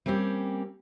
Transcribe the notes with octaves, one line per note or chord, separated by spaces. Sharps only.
G3 A#3 C4 C#4 G4